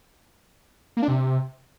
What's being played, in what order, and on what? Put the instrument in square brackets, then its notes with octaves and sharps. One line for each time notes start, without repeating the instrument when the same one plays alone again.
[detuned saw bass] A#3
D4
C3